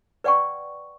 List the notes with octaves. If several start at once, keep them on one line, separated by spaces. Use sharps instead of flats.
B4 D5 F#5 G5 C#6